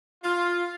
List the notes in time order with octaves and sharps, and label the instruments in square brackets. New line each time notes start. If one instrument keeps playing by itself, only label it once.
[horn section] F4